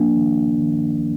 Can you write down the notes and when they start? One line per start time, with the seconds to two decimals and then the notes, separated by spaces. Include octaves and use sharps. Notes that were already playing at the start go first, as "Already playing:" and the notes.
Already playing: F3 A#3 D4
0.17 D#3
0.61 D#3